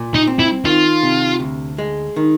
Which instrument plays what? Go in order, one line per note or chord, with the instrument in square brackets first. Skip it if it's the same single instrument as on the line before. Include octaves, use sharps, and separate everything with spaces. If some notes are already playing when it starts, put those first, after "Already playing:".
Already playing: [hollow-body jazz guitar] A#2
[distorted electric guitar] D#4
[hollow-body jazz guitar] C4
[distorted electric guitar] E4
[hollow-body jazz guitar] D#3 [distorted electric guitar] F4
[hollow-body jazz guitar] C3
D2
G#3
D#3